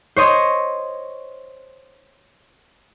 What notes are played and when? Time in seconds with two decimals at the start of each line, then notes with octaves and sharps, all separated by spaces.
0.16 C5 C#5 D#5 C6